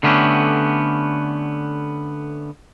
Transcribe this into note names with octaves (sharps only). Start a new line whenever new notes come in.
D3 A3 B3 C#4 G4